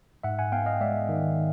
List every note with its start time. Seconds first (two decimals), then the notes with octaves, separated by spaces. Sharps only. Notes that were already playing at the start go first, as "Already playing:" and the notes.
0.24 G#2 E5 F#5
0.39 F#5 G#5
0.52 B3 F5 G5
0.66 D#5 F5
0.81 G#3 D5 E5
1.09 D#3